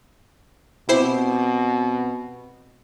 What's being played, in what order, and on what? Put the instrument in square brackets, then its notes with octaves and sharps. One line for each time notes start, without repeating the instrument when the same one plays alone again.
[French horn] B2 [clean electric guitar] C4 G4 [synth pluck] E4 C5 C6